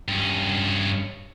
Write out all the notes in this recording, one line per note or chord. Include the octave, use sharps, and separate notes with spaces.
G2 C#4